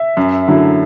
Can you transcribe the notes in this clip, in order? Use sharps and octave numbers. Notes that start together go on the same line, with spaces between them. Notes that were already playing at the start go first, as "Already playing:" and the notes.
Already playing: E5
F#2
D3 F#3 A3 E4